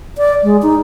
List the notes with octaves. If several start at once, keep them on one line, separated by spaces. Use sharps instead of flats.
D5
G#3
D#4